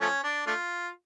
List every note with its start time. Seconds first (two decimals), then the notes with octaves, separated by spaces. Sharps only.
0.01 F3 A3 C#4
0.24 D4
0.47 A3 D4 F4